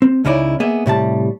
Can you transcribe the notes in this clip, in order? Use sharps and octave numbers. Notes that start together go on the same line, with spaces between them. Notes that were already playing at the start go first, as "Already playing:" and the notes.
C4
C#2 C#3 C#4 D#4 E4 D5
A#3 B3 G#4 D#5 E5
A2 C3 G3 A5